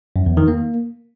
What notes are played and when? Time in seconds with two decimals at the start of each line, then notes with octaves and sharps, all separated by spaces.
0.16 F#2
0.26 E2
0.37 D#3
0.48 A#3